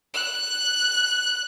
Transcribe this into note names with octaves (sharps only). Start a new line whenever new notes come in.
F#6